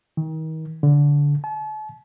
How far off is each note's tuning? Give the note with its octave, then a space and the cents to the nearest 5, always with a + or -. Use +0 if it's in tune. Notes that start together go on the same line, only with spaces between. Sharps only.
D#3 +35
D3 -20
A5 -40